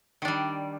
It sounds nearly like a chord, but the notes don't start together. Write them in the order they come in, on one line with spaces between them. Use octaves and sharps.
D#3 D4 G3